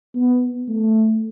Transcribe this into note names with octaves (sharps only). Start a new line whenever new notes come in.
B3
A3